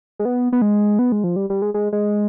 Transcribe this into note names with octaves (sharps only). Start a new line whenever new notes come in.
G#3
B3
B3
G#3
B3
G#3
F3
G3
G3
G#3
G#3
G#3